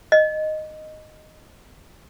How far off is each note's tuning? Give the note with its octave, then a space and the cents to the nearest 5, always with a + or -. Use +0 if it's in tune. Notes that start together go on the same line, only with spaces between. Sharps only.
D#5 -5